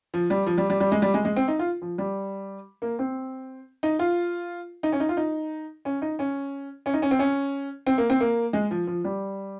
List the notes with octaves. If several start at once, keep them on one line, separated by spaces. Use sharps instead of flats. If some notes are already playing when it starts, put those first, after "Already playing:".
F3
G3
F3
G3
G3
G3
G#3
G3
G#3
G#3
C4
D#4
F4
F3
G3
A#3
C4
D#4
F4
D#4
C#4
D#4
F4
D#4
C#4
D#4
C#4
C#4
D#4
C#4
C4
C#4
C4
A#3
C4
A#3
G#3
F3
F3
G3